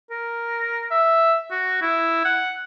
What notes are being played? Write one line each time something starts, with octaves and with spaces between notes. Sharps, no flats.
A#4
E5
F#4
E4
F#5